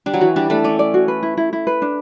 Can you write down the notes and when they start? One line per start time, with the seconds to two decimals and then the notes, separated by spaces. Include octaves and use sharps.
0.06 G3 D4
0.14 F#3
0.21 E3 F#4
0.36 G3 D4
0.50 A3 D4
0.64 C#4 D5
0.79 D5
0.94 F#4
1.08 B4
1.23 E4
1.37 E4
1.53 E4
1.67 B4
1.82 D4